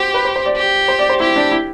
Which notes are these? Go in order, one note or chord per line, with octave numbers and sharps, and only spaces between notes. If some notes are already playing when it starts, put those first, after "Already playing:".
Already playing: F#4 G4 C5
B4
C5
C5
D5
G4
C5
D5
C5
E4 G4
D4
E4